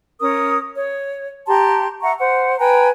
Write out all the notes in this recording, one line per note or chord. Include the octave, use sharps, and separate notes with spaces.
C#4 A#4 D#6
C#5
G4 A5 A#5 C6
E5 F#5 A#5 C#6
C5 F#5
B4 G5 G#5 A#5